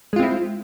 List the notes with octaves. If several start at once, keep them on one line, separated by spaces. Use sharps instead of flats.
G#3 C4 E4 F4